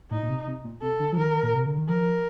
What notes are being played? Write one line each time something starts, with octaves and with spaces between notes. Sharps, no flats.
A2 D#4
A#2
C3
C3
A#2
C3 A4
D3
F3
D#3 A#4
A#2
C3
D3
D#3
F3 A#4